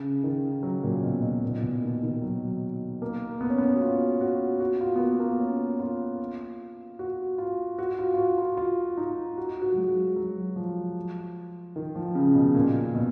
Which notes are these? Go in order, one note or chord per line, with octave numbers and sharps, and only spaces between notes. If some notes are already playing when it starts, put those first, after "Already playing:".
Already playing: C#3
D#3
F#3
A#2
B2
B2
A#2
B2
D#3
D#3
F#3
A#3
B3
C#4
B3
F#4
F4
F#4
F#4
F4
B3
A#3
A#3
C#4
F4
F#4
F4
F#4
F4
F4
F#4
F4
F4
D#4
F#4
F#4
F#3
G#3
F#3
F3
D#3
F3
C#3
B2
A#2
B2